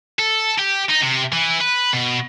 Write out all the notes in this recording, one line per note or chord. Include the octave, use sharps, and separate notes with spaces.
A4
G4
D#4
C3
E3
B4
B2